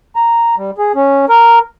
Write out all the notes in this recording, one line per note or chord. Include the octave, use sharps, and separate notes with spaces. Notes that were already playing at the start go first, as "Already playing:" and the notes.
A#5
G3
G#4
C#4
A#4